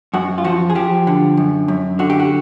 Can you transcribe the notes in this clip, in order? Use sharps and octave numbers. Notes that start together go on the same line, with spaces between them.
F#2 F#4
F4
F3 F#4
G#4
F3 G4
D3
F#2
F#2
D3 F#4
G4
F#4